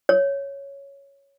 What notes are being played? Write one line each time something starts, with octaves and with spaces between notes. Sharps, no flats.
C#5